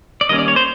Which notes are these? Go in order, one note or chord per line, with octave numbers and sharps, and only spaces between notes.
D5
D#3 G3 A#3 C#4 D#5
D5
C#5
C5